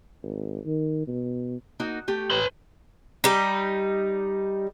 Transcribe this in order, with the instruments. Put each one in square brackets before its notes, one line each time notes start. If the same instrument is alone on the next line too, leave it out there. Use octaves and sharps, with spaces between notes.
[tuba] G#1
D#3
B2
[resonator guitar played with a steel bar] A#3 D#4 F#4
A3 G4
[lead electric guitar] B4 C6
[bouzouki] G3 D#4